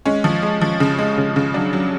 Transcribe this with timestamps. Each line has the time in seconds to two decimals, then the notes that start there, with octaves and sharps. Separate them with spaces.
0.06 G#3 C#4
0.24 F3
0.43 G#3
0.62 F3
0.80 C#3
0.99 G#3
1.18 C#3
1.36 C#3
1.54 F#3 D4
1.73 F#3